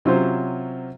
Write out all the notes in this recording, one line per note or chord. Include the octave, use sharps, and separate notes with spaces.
C3 F#3 C#4 F4 C5